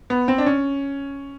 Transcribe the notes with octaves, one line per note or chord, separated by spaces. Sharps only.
B3
C4
D4
C#4